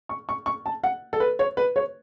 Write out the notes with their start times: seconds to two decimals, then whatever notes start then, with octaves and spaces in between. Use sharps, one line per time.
0.09 C#6
0.29 C#6
0.46 C#6
0.66 A5
0.84 F#5
1.13 A4
1.20 B4
1.39 C#5
1.57 B4
1.76 C#5